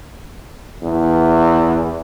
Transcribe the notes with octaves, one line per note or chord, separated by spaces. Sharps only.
E2